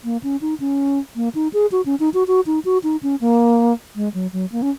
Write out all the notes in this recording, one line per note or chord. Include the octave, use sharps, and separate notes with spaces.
A#3
C#4
D#4
C#4
A#3
D#4
G#4
F#4
C#4
D#4
F#4
F#4
D#4
F#4
D#4
C#4
A#3
G#3
F#3
F#3
A#3
C#4